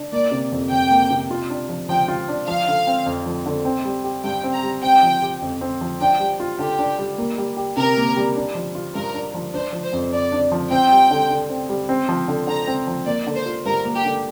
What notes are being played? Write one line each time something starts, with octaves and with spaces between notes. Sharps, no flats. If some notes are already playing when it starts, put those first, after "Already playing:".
Already playing: D4
A#3 D5
C3
F2
F2 G5
A#3
C3
F4
D4
F3
F3 G5
F4
D4
F3 F5
D3
C4
F2
F3
D3
C4
G3
G4
G2 G5
C4
A#5
G3
C4 G5
F3
G4
F2
C4
F3
D4 G5
G3
F4
D3 G4
D4
G3
A#3
G3
G4
C3 A#4
A#3
G3
D4
F3
F4
G2 A#4
D4
F3
D4 C5
F3
C5
F2
F2 D5
D4
F3
C4 G5
G3
D3
D3
C4
G3
C4
F3
D3
D3 A#5
C4
F3
A#3 D5
D3
C5
F4
G2 A#4
A#3
G4
D3